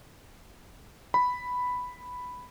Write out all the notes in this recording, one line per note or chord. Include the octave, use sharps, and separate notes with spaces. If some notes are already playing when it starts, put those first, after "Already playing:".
B5